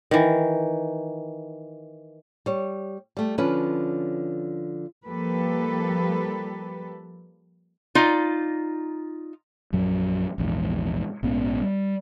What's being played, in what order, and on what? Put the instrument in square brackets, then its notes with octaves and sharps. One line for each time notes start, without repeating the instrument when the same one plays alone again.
[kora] D#3 E3
[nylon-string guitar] G3 C#5
G3 A3
D3 F3 C#4 B4
[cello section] F3 G3 A#3 G4 A4 B4
[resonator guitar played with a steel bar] D#4 F4 D5
[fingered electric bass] A#1 F#2 F#3
A#1 E2 G#2
A#1 G#2 B3 C#4
G3